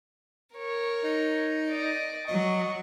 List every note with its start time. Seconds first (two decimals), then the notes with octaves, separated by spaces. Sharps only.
0.55 A#4 C#5
1.04 D#4
1.69 D5 D#5
2.28 F#3 D#5 C#6